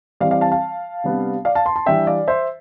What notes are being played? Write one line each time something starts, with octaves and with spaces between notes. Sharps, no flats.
E3 G3 C4 D5 F5
D5 F5
F5 A5
F5 A5
C3 G3 B3 D4
D5 F5
F5 A5
A5 C6
A5 C6
E3 G3 D4 E5 G5
D5 F5
C5 E5